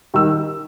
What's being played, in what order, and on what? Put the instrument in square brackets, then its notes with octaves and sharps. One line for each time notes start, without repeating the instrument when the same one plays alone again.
[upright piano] D#3 G3 E6